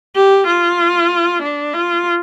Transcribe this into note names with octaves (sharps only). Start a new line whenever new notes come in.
G4
F4
D4
F4